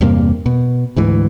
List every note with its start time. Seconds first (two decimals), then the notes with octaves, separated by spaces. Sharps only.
0.01 E2 G2 C3 A#3
0.46 B2
0.96 D2 G#2 E3